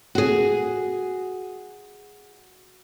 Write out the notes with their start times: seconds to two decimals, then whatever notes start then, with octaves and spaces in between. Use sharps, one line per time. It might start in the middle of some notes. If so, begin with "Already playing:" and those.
0.15 F#4 G#4